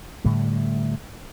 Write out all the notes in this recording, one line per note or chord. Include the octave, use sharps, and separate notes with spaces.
A2 D3 G3